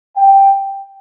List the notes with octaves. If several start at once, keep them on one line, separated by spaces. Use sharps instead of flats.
G5